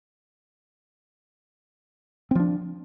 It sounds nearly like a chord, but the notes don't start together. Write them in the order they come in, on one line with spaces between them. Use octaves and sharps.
C4 F3 D4